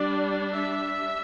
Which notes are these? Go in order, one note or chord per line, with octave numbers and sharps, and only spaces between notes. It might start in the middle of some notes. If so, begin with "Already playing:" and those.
Already playing: G3 D4 D5
E5